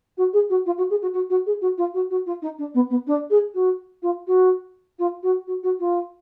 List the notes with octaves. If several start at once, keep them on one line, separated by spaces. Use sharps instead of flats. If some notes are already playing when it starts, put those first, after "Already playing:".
F#4
G#4
F#4
F4
F#4
G#4
F#4
F#4
F#4
G#4
F#4
F4
F#4
F#4
F4
D#4
D4
B3
B3
D4
G#4
F#4
F4
F#4
F4
F#4
F#4
F#4
F4